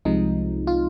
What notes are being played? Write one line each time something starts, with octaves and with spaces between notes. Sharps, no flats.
C2 C3 F3 G#3 D#4
F4